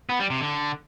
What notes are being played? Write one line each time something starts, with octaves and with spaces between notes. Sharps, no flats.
B3
G3
C3
D3